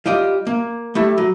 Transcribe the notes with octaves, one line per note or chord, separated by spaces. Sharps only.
G3 F4 D5 D#5
A#3
G3 A3 E4
F#3